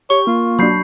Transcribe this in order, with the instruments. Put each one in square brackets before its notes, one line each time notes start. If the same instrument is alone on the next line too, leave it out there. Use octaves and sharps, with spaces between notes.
[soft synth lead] G4 [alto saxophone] C#5 [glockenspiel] C#6
[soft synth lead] A#3 [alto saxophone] F4
[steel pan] F#3 D4 [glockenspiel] B5 G6 C7